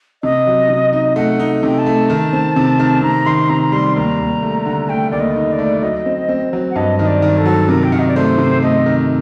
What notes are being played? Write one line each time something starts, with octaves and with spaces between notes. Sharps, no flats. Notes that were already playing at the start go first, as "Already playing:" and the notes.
C3 D#5
F#3
C3
D#4
D#5
A3 F#5
D#4
C3 G5
A5
A3
D#3
C4
C3
D#3
C3 A#5
D#3 C6
C3 A#5
A#5
G3 C6
D#2 A#5
D#2
A3
D3
A3 G5
D#2 D5
D#5
D#4
D5
A3
F#3 D#5
C4
C4
F#3
F#5
G2 D#5
D#3 D#5
D5
D#3
A4
F#3
C3 A#4
G5
D#3 F#5
D#5
D5
A3 C5
C3
A3 D#5
D#3